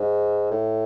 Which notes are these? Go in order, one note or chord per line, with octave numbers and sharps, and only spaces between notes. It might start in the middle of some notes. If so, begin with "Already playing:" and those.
Already playing: G#2
A2